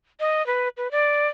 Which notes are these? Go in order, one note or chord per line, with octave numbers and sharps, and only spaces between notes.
D#5
B4
B4
D5